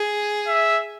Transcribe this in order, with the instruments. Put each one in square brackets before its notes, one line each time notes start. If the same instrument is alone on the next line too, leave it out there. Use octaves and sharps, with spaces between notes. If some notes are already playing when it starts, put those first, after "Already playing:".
Already playing: [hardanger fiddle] G#4
[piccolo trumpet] E5